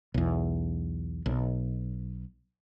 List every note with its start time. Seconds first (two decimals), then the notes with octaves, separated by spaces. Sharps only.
0.14 B1 E2
1.26 B1